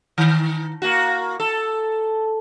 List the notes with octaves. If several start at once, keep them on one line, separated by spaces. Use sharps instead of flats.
D#3
A#3 F#4
A4